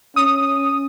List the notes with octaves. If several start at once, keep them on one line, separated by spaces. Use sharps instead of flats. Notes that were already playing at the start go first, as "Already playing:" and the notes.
C#4 D#6